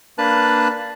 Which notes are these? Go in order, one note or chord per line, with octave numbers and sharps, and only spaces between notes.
A#3 D4 B4 A5 F#6